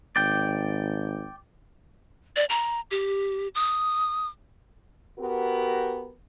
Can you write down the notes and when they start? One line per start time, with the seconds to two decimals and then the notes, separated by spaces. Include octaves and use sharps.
0.16 G#1 D5 G5
2.36 D5
2.49 A#5
2.91 G4
3.55 D#6
5.19 B3 F#4 G4 A#4